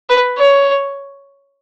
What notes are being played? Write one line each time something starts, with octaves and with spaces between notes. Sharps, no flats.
B4
C#5